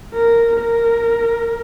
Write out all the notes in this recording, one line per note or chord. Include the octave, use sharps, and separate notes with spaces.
A#4
A#4